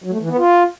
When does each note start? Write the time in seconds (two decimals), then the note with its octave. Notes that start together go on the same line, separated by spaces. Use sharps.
0.04 F#3
0.12 A3
0.21 E3
0.29 B3
0.38 F4